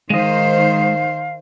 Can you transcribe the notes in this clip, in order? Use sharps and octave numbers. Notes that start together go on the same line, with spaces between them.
D#3 G#3 C5 D#5 F5